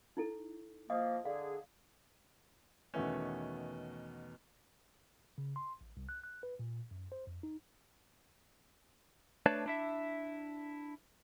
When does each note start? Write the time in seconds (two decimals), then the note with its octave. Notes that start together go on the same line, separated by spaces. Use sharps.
0.17 D#4 E4 A4
0.90 F3 A#3 D#5 F5 D#6
1.26 D3 G#4 F5
2.94 E2 B2 D#3 A3 B3 C#4
5.38 C#3
5.56 C6
5.81 A1
5.97 C2
6.09 F#6
6.24 F#6
6.43 B4
6.59 A#2
6.91 F#2
7.12 C5
7.27 F2
7.43 D#4
9.46 A3 D4 B4 C#5 D5 A5
9.66 D4 E4 E5